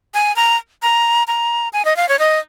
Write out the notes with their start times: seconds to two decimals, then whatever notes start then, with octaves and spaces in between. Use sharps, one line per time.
0.14 G#5
0.36 A#5
0.82 A#5
1.28 A#5
1.73 G#5
1.85 D#5
1.96 F5
2.09 C#5
2.19 D#5